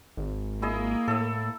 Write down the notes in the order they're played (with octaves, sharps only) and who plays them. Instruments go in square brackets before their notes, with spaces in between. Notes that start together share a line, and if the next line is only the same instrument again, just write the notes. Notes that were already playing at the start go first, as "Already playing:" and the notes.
[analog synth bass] G#1
[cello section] A#3 [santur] E4 G#4 D#5
[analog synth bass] A2 [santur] A4 E5